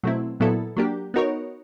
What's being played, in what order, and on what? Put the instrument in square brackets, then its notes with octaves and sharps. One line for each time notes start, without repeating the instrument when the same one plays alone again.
[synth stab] B2 F#3 A3 C4 E4
A#2 F#3 B3 E4 A4
F#3 A#3 D4 G4
B3 D#4 F#4 A#4 C#5